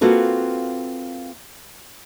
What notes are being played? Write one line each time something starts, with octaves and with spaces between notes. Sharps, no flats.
A#3 C4 F4 F#4 A4 B4